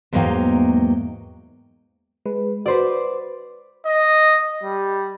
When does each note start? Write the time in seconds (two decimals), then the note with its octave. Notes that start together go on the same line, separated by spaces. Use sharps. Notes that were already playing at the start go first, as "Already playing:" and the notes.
0.12 E2 G#2 F#3 A#3 D#4 G5
2.25 G#3 B4
2.66 F#4 B4 C5 D5
3.86 D#5
4.64 G3